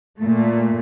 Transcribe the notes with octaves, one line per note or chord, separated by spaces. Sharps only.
A#2 A3